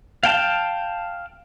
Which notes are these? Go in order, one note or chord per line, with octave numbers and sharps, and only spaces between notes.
F5 G5 A5